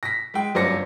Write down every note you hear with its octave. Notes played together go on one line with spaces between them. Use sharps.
A#6 B6
G#3 G5
G1 F#2 C5 D5 A#6 C#7